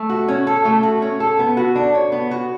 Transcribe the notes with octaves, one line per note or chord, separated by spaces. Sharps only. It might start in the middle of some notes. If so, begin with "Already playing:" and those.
Already playing: A3
F#4
C#4
A4
A3
F#4
C#4
A4
B3
F#4
D4
C#5
B3
F#4